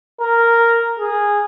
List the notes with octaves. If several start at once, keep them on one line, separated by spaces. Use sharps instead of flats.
A#4
G#4